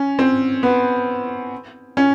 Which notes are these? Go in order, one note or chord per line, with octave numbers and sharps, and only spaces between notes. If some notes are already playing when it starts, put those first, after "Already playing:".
Already playing: C#4
C4
B3
C#4